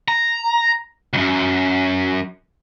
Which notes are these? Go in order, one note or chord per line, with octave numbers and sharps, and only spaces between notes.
A#5
C#2 F#2